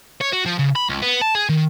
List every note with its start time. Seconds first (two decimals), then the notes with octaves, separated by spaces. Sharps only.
0.21 C#5
0.32 F#4
0.45 F3
0.58 C#3
0.76 B5
0.90 C#2
1.02 B3
1.22 A5
1.35 G#4
1.49 D#3